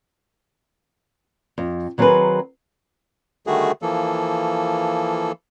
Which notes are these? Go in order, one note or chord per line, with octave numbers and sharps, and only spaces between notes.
F2
D#3 F#3 C4 G#4 A#4 B4
D3 D#3 G3 A3 F#4 G#4
E3 F3 A#3 A4